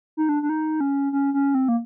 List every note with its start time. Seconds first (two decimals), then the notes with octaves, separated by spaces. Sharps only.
0.17 D#4
0.29 D4
0.43 D4
0.49 D#4
0.80 C#4
1.13 C#4
1.34 C#4
1.55 C4
1.68 A#3